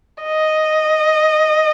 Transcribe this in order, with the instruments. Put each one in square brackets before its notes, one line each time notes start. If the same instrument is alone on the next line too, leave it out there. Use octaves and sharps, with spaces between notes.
[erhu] D#5